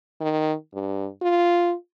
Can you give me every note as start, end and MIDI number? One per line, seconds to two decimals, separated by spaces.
0.21 0.54 51
0.74 1.08 43
1.22 1.74 65